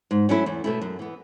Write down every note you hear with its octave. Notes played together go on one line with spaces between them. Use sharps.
G#2
F#3 A3 C#4 E4
E2
B2 A3 E4
F#2
E3 B3